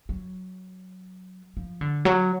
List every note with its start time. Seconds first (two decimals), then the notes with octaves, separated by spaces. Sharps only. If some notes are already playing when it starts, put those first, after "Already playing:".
0.09 F#3
1.57 F3
1.81 D3
2.05 F#3